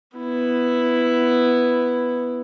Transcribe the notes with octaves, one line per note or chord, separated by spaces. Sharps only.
B3 E4